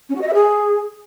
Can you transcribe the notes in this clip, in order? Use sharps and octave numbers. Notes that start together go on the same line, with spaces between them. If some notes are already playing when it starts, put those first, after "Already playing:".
C#4
F#4
D#5
E5
G#4